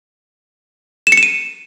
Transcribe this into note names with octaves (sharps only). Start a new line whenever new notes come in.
E7
C#7
E7
D#7